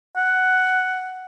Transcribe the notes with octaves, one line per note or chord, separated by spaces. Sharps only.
F#5